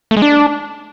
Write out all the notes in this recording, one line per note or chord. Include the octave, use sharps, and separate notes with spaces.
A3
G#3
D4